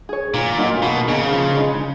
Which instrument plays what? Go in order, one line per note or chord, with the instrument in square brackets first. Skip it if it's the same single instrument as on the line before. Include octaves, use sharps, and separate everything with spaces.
[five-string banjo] G#4 C#5
[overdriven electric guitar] A#2 [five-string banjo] D#3
[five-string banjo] F#3 A#3 D#4 F#4
[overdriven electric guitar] B2 [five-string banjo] D#3
[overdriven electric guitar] C#3 [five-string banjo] A#3 D#4 G#4
[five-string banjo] F3
G#3 D#4